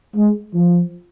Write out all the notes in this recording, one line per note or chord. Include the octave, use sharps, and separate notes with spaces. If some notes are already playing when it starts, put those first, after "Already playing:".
G#3
F3